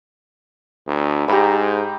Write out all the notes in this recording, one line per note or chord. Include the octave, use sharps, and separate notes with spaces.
D2
G#2 G4 A#5 B5